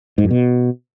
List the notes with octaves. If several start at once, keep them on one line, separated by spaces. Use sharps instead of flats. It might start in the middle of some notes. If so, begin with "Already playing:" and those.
G#2
F#2
B2